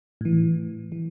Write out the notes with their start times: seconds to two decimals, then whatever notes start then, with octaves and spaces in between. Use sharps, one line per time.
0.21 A2 E3
0.92 E3